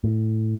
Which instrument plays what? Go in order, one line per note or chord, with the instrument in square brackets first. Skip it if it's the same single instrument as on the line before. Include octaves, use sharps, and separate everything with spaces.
[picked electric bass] A2